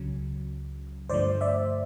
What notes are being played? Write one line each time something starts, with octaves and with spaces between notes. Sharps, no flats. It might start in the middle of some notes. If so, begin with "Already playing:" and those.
Already playing: C#2 C#3 F#3
G2 D3 F3 A3 C5 D5
D5 E5